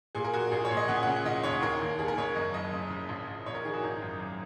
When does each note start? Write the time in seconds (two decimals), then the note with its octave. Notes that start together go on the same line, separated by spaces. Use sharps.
0.15 A#2 G#4
0.24 A#4
0.34 A#2 F#4
0.52 A#1 G#4
0.65 C#5
0.71 A#2
0.77 D#5
0.88 C#3 F#5
0.96 G#5
1.03 C#3 F#5
1.16 F#5
1.25 C#3 D#5
1.43 D#2 C#5
1.62 D#2 A#4
1.81 D#2
1.99 D#2 G#4
2.08 A#4
2.18 C#3 C#5
2.36 F#2 D#5
2.54 F#1 D#5
2.73 C#3
2.90 C#3
3.09 A#1
3.27 A#1
3.46 A#1 C#5
3.55 A#4
3.65 D#3 G#4
3.74 F#4
3.82 G#1 D#4
4.02 F#2
4.20 G#1